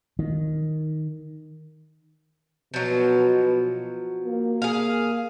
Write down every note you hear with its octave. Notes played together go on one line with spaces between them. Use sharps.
D#3
B2 F3 F#3
A#3
G#4 F5